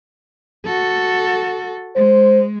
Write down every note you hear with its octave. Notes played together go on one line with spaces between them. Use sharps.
F#4 A4
G#3 C5